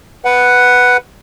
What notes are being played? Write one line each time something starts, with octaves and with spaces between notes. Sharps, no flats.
B4 F#5